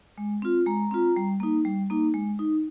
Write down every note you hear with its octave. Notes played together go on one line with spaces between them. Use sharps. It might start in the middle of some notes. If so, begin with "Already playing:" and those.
G#3
C4 F4
G#3 A#5
C4 F4
G3
A#3 D#4
G3
A#3 D#4
G#3
D#4